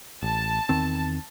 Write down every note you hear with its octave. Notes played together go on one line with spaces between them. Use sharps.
A1 A5
E2 D#3 C4